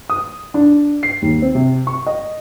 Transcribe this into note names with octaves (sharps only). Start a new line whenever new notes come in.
D#6
D4
C7
D#2
C4
C3
C#6
D#5